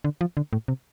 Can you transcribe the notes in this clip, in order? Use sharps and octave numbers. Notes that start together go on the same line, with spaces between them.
D3
F3
D3
A2
C3